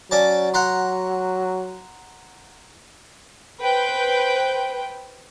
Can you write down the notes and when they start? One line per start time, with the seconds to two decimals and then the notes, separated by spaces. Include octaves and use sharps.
0.11 F#3 C#4 D5 A5
0.54 F#5 A#5 C6
3.61 B4 C5 G5